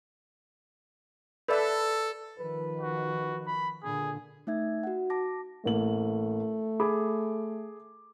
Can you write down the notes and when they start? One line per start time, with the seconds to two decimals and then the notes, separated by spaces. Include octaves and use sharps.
1.48 A4 B4 D5 E5
2.38 D#3 F3 B4
2.81 F#4
3.47 B5
3.83 A#2 D3 G#4
4.47 A3 D#4 E5 G#6
4.83 F#4 F#5
5.10 A5 D6 A#6
5.65 A1 A3 A#3 F#7
6.80 G#4 B5 D6